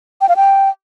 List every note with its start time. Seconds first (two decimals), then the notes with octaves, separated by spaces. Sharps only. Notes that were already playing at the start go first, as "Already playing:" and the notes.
0.21 G5
0.29 F5
0.36 G5